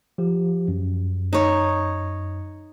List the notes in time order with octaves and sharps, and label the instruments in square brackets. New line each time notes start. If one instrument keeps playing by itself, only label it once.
[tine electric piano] F3 G4
F#2
[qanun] D#4 C#5